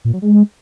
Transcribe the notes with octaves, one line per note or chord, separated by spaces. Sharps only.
A#2
F#3
G#3